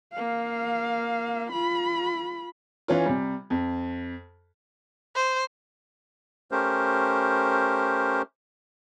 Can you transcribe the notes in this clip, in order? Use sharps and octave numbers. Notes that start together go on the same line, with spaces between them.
A#3 F5
F4 B5
E3 C#4 F4
C3 G3
F2
C5
A3 C#4 G4 A#4 C5